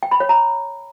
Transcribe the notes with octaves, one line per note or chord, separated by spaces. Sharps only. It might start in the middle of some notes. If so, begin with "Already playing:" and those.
G5
B5
C#5
A#5